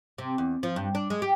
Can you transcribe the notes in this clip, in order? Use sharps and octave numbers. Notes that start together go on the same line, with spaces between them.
C3
E2
F3
G2
D4
G#3
G4